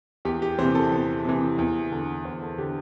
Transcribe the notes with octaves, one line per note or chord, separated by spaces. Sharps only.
E2 G4
G4
C3 E3 C5
A4
E2
C3 E3
E2
D3
E2 C5
A4
D3 G4